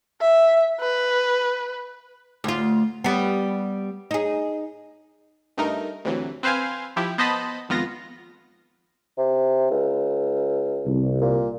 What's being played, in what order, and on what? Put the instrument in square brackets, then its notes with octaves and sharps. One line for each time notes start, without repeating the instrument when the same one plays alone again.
[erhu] E5
B4
[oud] D2 F4
G3 B3
D#4 G#4
[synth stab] G2 A3 D#4 A#4
D2 C3 E3 F#3
C4 B4 C5 F5 G#5
F3 E4 G4
B3 C5 D#5 A5 B5
G#1 F2 B3 F4 A#6
[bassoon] C3
C#2
[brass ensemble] C2
[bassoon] A#2